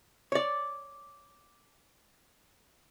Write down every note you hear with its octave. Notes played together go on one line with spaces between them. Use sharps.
C#5 D5